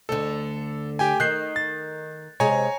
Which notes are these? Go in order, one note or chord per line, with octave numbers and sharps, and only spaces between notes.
D2 D3 A4
G4 G5 G#5
D#3 F#6 G6 C7
A6
C3 G#3 C#5 G#5 A#5